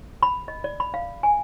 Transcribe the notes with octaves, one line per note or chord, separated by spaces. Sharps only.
B5
D#5
D5
B5
F5
G#5